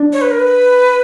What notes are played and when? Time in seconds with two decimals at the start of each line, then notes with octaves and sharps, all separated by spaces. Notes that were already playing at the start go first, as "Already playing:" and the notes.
Already playing: D4
0.13 C#5
0.21 B4
0.31 A#4
0.39 B4